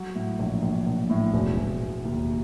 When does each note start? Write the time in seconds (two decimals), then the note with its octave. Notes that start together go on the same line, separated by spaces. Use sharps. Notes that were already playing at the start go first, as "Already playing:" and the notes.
Already playing: F#3
0.15 A2
0.39 A#1
0.62 A#1
0.87 A#1
1.10 A2
1.34 E1
1.57 E1
1.81 E1
2.05 D#2